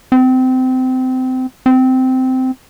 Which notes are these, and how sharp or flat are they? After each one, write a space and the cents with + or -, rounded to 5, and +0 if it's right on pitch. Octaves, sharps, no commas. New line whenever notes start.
C4 -25
C4 -15